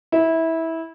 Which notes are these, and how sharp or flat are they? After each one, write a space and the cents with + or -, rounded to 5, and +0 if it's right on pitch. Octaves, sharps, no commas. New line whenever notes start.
E4 -20